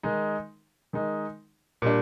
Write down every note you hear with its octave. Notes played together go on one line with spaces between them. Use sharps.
D#3 G#3 D#4
D#3 G#3 D#4
A#2 G3 D4